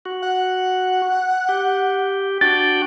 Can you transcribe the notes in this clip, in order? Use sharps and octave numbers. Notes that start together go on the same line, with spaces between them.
F#4
F#5
G4
D4 F#4 G5 A6